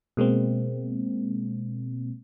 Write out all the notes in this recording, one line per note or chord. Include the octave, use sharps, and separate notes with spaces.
B2 G#3 A#3 C4